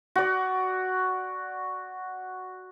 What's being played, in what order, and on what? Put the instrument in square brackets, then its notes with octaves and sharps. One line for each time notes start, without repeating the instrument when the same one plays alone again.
[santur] F#4 D5